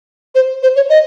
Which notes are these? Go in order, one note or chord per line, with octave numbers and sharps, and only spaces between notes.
C5
C5
C#5
D#5